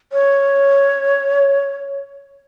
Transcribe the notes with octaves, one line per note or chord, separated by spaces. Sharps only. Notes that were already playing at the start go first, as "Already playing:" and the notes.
C#5